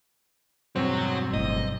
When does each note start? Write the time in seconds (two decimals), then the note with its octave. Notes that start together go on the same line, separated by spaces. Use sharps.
0.76 B1 E2 G2 C4 F#4 C5 C#5
1.33 G1 A2 D#5